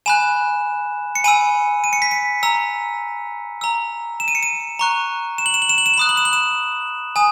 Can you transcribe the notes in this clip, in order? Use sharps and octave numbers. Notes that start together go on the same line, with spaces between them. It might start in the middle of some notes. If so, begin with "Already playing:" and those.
G#5 B5 F#6 E7
C#7
G#5 B5 E6 D#7
D#7
C#7
B6
C#7
A#5 E6
A#5 E6
E7
D#7
C#7
D#7
A#5 C#6 F#6
E7
F#7
E7
F#7
E7
F#7
E7
F#7
B5 D#6 F#6 E7
F#7
E7
F#7
E7
G#5 D#6